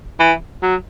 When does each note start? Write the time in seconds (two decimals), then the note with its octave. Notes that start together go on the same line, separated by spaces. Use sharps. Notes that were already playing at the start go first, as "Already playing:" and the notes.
0.20 E3
0.63 F#3